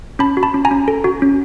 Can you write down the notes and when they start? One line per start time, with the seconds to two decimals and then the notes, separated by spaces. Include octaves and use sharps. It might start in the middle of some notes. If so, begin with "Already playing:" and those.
0.19 C#4 A5 B5
0.37 F#4
0.43 A5 B5
0.54 C#4
0.65 G#5 A#5
0.71 C#4
0.88 A4
1.04 F#4
1.22 C#4